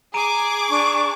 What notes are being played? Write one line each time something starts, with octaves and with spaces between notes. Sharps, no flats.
G#4 A#5 D6 D7 D#7
D4 C#6